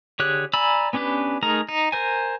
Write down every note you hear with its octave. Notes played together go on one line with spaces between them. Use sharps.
D3 G4 G#4 C#5 F#6
D5 G#5 A#5 B5 E6
B3 C#4 D4 G4 B4
A3 D#4 G#4 A#4 A#5
D#4
A#4 C5 G#5